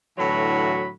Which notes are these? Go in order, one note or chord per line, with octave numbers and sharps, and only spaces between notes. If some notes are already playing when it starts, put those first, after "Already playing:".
A2 D3 E3 F#3 F#4 B5